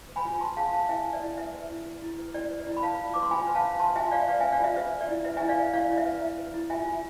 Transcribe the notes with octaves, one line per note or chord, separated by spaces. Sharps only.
B4
G#5 B5
F4
B4 A5 C6
G#4 F5 A5
B4 F5 A5
E4 E5 G#5
B4
D5
E4
B4 E5
B4
E4
B4
E4
B4
E4 D5
B4
D5
E4
B5
B4 F5 A5
F4
B4 D6
C6
F4 G#5 B5
B4
F5 A5
B4
B4 A5 C6
F4 E5 G#5
F4 D5 F5
B4 D5 F5
E5 G#5
B4
D5 F5
F4 E5
B4 E5
B4
D5
E4
B4 E5
E5 G#5
E4
D5 F5
B4
E4 D5 F5
E4
E5
B4
E4
B4
E4
F4 E5 G#5
F4